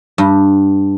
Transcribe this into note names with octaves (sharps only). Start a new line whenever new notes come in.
G2